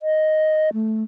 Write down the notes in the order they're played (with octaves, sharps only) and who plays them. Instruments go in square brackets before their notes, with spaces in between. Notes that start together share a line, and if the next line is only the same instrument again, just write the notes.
[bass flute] D#5
A3